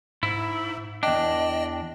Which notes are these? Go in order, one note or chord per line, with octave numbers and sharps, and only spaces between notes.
G#2 E4
E2 D4 D#5 G5